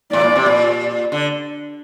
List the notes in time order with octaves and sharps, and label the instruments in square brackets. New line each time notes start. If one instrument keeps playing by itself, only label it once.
[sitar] A2 [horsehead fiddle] D5
[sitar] A#2
C3
A#2
D3